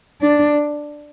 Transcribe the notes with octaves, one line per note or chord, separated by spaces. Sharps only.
D4